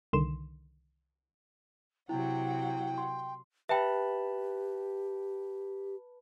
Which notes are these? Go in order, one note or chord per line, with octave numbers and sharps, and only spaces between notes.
C2 D3 D#3 C6 E7
C3 F#3 E4 F#5 G5
C6
G4 B4 E5 G5 A5 B5